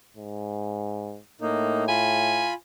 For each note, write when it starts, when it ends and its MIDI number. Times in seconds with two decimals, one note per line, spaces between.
0.17 1.19 44
1.41 2.52 45
1.41 1.85 58
1.41 1.85 63
1.88 2.54 65
1.88 2.53 80
1.88 2.54 83